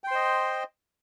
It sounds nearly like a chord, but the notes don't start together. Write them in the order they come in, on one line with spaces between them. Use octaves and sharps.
G5 C6 C5 D#5